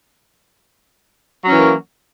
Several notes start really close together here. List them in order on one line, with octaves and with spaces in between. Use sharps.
F#3 C#4 E3 A#3